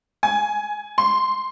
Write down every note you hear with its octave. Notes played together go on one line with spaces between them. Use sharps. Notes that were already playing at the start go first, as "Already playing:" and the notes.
G#5
C6